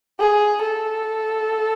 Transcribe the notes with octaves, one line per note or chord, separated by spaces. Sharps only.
G#4
A4